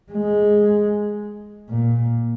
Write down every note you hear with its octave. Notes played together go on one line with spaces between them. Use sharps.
G#3
A#2